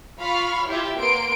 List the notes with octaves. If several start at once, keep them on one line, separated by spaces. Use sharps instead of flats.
F4 F5 B5 C#6 F6
E4 F4 G4 E5
A#3 B3 C6 D7